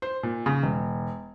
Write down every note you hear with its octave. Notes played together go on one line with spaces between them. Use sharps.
C5
A#2
C#3
E1